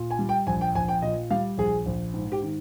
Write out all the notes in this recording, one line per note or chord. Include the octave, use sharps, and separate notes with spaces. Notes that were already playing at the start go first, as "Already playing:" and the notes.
Already playing: A#2
G#5
G3
G5
A#1 G#5
G5
A#1 G#5
G5
A#2 D#5
G3 F5
A#1 G#4
A#1
G#2
G4
D#3